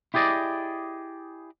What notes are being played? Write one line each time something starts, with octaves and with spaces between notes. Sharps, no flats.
E4 G4 G#4 D5 D#5